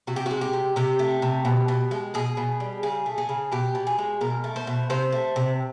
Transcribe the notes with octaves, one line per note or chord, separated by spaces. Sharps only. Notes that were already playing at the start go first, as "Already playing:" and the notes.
C3 F#4
G4
G#3 F#4
G4
C3
C3 G4
A3
C3
B2
B2
G#3
B2 G#4
B2
G3
C#3 G#4
A3
G#4
C#3
B2 G4
B2
G#4
G#3
B2 A#4
A3
C5
B2
C3 C5
A3
C3